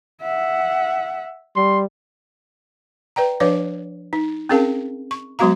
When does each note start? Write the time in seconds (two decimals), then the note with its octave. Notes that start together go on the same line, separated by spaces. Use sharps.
0.22 E5 F#5
1.56 G3 C6
3.16 B4 D5 G5 A#5
3.40 F3 D4 B4 C#5 D5 F5
4.13 D#4
4.49 C4 C#4 G#4 A#4 F5 A5
5.11 C#6
5.39 F#3 G#3 B3 F#4 F5 A#5